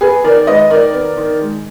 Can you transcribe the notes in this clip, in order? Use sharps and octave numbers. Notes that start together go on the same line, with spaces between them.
B3 G#4 B4
D#3 A#4 D5
G#3 B4 D#5
D#3 A#4 D5
B3
D#3
G#3